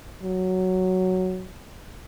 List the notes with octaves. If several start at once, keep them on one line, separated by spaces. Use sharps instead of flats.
F#3